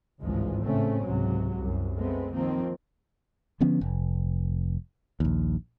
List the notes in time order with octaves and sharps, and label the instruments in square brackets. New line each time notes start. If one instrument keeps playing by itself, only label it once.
[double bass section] G#1 C#2 G2 E3 F3 G#3
A2 C#3 A3 C4 C#4
C#2 G#2 C3 F#3
C2 F#2
G#3 A3 B3 C4
D#3 F3 A#3 C4
[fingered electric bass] D3 F3 B3 C#4
F1
A#1 D#2